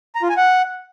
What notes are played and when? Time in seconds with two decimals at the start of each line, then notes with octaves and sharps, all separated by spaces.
0.15 A#5
0.22 F4
0.30 G#5
0.37 F#5